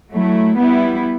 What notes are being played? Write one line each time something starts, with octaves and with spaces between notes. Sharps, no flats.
F#3 A3 E4
G3 B3 E4